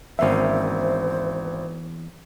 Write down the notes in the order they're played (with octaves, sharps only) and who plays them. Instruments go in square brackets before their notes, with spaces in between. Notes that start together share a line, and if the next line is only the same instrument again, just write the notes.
[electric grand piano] G#1 E5 [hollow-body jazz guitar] E2 A#3 C#4 [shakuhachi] C5